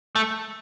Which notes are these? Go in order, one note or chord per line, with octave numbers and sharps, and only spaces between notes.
A3